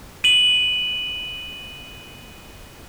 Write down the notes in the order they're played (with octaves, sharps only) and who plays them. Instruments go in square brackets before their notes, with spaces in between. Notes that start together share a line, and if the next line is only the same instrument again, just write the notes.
[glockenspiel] D#7 F#7